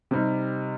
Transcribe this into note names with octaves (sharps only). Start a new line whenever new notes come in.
C3 G3 D#4